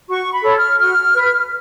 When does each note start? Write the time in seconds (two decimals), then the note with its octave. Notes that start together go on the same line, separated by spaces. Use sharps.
0.08 F#4 C#6
0.32 B5
0.43 A4 C#5
0.56 F6
0.79 F#4 F6
1.14 B4